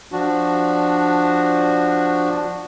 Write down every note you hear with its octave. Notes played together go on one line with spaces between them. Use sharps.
F3 D4 F#4